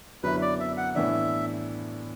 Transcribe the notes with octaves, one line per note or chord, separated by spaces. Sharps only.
F#2 D3 B3 E4 B4
D5
E5
F#5
A2 E3 B3 D4 E5